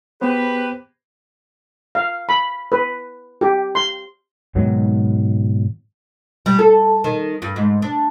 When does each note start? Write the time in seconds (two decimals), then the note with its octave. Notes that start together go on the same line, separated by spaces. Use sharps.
0.21 B3 G4 G#4 B4 C5
1.95 F5
2.29 B5
2.72 B4
3.41 G4
3.75 C6
4.55 G#2 B2 D#3 F#3
6.46 G3
6.59 A4
7.04 D#3
7.42 G2
7.56 G#2
7.82 D4